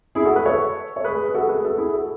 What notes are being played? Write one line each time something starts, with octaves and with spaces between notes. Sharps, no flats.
E4 G#4
F#4 A4
G#4 B4
A4 C#5
C#5
G#4 B4
G#4
F#4 A4
G#4 B4
F#4 A4
E4 G#4
F#4 A4